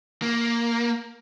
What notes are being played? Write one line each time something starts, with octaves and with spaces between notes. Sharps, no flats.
A#3